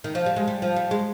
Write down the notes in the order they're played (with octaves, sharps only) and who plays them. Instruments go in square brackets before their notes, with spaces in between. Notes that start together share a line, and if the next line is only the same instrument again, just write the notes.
[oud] D#3
F3
G3
G#3
G3
F3
G3
G#3